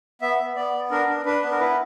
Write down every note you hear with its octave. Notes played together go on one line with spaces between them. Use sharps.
B3 E5
B3
B3 D5
B3
D4 A#4
D4
D4 B4
B3
A#4
E4 B4